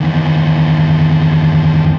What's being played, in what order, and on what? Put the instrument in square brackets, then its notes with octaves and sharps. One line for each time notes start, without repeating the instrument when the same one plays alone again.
[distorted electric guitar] E2 D#3